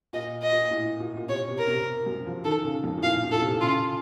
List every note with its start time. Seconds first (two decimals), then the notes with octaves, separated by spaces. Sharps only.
0.13 A#2 D#5
0.42 D#5
0.52 A#2
0.71 A2
1.00 A#2
1.17 A#2
1.28 C3 C#5
1.48 C3
1.58 A#4
1.67 C3
2.06 F#2
2.26 F3
2.44 D#3 A4
2.64 C#3
2.84 F2
2.97 A2
3.03 A#2 F5
3.23 A2
3.32 A4
3.35 A#2
3.41 C3
3.61 C#3 F4